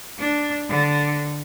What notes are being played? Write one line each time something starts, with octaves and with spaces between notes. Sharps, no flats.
D4
D3